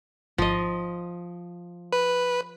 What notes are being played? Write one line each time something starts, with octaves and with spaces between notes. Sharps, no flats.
G#1 F3 D#5
B4